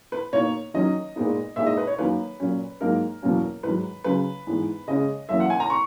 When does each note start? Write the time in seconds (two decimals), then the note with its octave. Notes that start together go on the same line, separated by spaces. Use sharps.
0.12 B4
0.33 B2 A#3 D#4 C#5
0.74 D#3 F#3 C#4 D#5
1.16 A#2 G#3 B3 D#4
1.56 A#2 G#3 D#4 E5
1.66 D#5
1.77 B4
1.87 C#5
1.98 F#2 D#3 F#3 A#3 B4
2.40 A#2 F#3 C#4
2.81 G#2 F#3 A#3 D#4 A#4
3.22 E2 B2 F#3 A#3 C#4
3.63 G#2 D#3 F#3 B4
4.04 C#3 F#3 C#4 B4
4.47 G#2 E3 B3
4.88 C#3 G#3 C#4 D#5
5.29 F#2 E3 A#3 C#4 E5
5.40 F#5
5.50 G#5
5.60 A#5
5.70 C#6